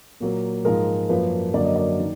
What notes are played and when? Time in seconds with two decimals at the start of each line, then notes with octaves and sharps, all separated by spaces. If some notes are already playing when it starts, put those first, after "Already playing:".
0.20 A#2 F#3 A#3
0.64 G#2 F3 G#3 A#4
1.09 F#2 F3 A#3 B4
1.53 F#2 D3 F#3 A#3 D5
1.65 D#5
1.76 D5
2.00 D#3